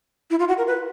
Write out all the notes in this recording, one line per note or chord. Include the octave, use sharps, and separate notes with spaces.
E4
F4
F#4
A#4
B4